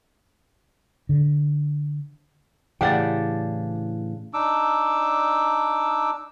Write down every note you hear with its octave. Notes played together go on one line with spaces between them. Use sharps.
D3
A2 C#3 E3 D4 G4 D5 F#5 G5
D4 D#4 D6 E6